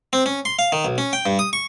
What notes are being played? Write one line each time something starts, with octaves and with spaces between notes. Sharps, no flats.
C4
C#4
C6
F5
D#3
B1
C#4
G5
G2
D#6
C#6